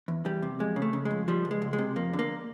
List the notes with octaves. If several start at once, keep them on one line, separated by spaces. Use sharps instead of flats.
E2
E2 G3
C3
F2 G#3
C#3
A3
C#3
G#3
F2
F3 G3
C#2
G#3
C#2
G#3
C3
F2 A#3
D3
A#3